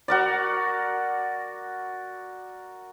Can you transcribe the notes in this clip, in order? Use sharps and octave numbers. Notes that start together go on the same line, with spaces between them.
F#4 A#4 D5